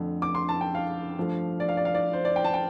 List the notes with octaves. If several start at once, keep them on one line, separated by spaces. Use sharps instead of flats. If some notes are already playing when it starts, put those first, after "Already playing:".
Already playing: F2 D3 A3
D6
C6
A5
G5
F5
G2 F3 A3
D5
F5
D5
F5
D5
C5
D5
G5
A5
G5